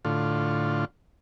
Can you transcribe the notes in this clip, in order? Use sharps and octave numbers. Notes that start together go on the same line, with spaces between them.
A2 D3 F4